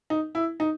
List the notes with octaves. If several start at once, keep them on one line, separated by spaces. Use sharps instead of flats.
D#4
E4
D#4